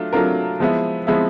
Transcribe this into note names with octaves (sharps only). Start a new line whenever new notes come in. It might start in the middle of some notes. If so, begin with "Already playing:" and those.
Already playing: F#3 A3 D4 F4
F#3 A3 D4 F4 A#4
F3 G#3 B3 E4
F3 G#3 B3 E4